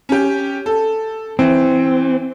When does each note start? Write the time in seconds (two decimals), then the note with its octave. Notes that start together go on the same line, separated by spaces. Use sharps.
0.09 C#4 G4
0.66 A4
1.39 E3 C4